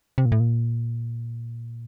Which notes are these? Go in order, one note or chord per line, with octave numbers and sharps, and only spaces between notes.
C3
A#2
A2
A#2